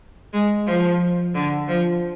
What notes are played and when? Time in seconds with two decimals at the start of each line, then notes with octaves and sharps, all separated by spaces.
0.33 G#3
0.66 F3
1.35 D3
1.68 F3